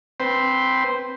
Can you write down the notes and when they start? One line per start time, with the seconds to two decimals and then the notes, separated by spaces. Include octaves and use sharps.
0.20 C4 B4 C5 G5